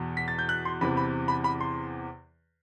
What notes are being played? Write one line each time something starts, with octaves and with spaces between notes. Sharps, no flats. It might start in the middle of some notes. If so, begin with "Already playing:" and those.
Already playing: E2 B2
B6
A6
G6
F#6
C6
E2 C3 E3 B5
B5
B5
B5
C6